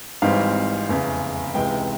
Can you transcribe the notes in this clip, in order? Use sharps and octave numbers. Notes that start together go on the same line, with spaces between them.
G#1 G#2 E3 G3 C4 F5
F1 E2 C#3
C#2 C3 E3 G#3 G5